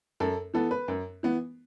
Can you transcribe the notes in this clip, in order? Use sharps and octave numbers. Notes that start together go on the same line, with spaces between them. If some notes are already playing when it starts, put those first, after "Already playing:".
F#2 A4
E3 B3 A4
B4
F#2
E3 B3